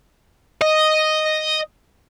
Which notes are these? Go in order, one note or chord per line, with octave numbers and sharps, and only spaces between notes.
D#5